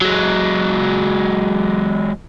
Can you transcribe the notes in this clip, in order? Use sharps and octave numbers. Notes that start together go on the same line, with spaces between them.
F#3 G#3